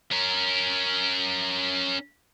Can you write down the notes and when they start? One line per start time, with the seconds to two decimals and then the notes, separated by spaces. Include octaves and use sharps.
0.11 C#4 A#4